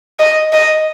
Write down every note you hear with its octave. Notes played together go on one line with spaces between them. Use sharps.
D#5
D#5